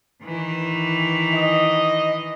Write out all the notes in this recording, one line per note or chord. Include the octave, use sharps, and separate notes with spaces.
D#3 E3
D#5